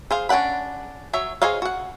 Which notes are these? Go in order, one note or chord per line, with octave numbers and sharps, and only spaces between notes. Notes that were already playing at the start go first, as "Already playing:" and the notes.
G#4 C5 F5
C#4 D4 D5 F#5 B5
F#3 C#5 E5
G#4 C5 C#5 D#5 F5
F#4 F#5